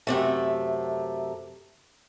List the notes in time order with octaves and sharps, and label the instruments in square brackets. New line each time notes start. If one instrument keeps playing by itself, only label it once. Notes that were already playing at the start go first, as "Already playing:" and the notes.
[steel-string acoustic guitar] F#2 C3 A3